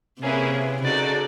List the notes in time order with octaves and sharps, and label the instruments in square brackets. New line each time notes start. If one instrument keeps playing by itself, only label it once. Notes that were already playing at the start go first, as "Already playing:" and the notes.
[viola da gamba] C3 [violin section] A#3 C#4 E4 G#4 B4
[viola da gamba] C#3 [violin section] D#4 F#4 A4 D5